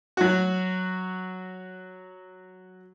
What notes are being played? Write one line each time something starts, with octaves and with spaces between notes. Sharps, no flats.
F#3 F#4